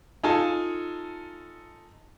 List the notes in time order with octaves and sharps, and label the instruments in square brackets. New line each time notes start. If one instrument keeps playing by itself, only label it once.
[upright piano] D#4 F4 A4 G#5 A5